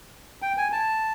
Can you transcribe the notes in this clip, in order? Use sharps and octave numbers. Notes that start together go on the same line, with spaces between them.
G5
G#5
A5